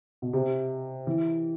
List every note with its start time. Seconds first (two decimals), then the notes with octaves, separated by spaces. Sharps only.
0.22 B2
0.33 C3
1.07 E3